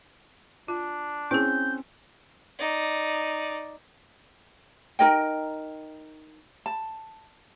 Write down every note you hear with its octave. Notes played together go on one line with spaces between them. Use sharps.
D4 F4
C4 C#4 E4 G#4 G6
D#4 D5
D#4 A#4 D#5 G5
A5